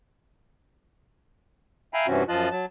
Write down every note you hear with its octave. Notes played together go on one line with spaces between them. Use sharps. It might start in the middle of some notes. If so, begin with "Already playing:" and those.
E5 F5 G5 G#5 A#5 B5
G2 C3 E3 C4 C#4 F#4
F#2 F3 F4 D#5 A5 F#6
F#3 A5